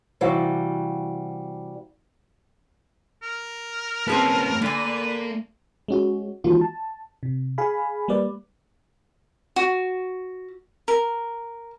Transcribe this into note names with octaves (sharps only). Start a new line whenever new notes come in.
C3 E3 G3 F#4 F5 F#5
A#4
A#3 C4 C#4 G#4 B4 A5
D3 A#3 B4 D5 G#5
G#3 C#4 F#4
D#3 E3 G#3 A#3 F4 F#4
A5
C3
G#4 F5 G#5 B5
G3 A#3 B4 D5
F#4
A#4